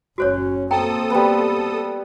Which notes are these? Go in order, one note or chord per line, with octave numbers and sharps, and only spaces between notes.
F#1 C#4 F#4 C5 C#5
A#3 C4 A4 G5 A#5 D#6
G3 B3